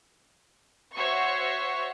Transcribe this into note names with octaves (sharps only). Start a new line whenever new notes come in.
F#4 C5 C#5 E5 C#6